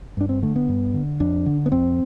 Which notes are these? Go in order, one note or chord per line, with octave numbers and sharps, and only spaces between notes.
G2 D4
C4
D3 A3
B3
G2
D3
F2 D4
D3
B3
F2 C4